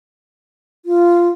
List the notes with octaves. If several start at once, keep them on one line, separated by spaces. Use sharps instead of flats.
F4